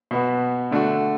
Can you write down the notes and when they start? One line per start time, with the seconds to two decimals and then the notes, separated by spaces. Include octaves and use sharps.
0.11 B2 B3 F#4
0.71 D3 A3 D4 F#4